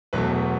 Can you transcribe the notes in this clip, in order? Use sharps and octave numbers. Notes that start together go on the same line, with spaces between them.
E1 E2 B2 F#3 A3 B4